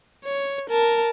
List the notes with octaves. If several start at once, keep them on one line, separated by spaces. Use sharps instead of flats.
C#5
A#4 A5